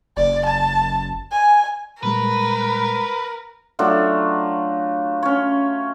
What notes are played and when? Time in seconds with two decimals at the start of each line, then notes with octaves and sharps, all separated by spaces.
0.17 F#1 D5
0.46 A5
1.32 G#5
2.03 A#2 G3 G#3 A#4 B4
3.79 F#3 A3 D4 F4
5.23 C#4 C#5